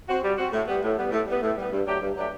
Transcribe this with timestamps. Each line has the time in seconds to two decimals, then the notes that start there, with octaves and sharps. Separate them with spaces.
0.08 C4 F#4
0.23 G3
0.38 C4 F#4
0.53 A2
0.68 G3 B3
0.83 A2
0.98 G3 B3
1.12 A2
1.27 G3 B3
1.42 A2
1.57 G3 B3
1.72 G2
1.87 F#3 A3 D4 G4
2.01 G2
2.17 F#3 A3 D4 G4